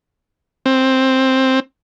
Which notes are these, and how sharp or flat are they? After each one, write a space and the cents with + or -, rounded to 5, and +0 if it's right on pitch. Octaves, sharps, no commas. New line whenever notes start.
C4 +10